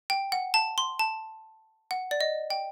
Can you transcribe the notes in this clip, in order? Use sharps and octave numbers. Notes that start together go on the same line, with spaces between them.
G5
F#5
A5
C6
A5
F#5
D5
D#5
G5